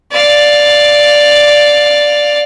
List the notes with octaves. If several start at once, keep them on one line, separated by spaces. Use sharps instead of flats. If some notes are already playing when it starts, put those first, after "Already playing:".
D5 F5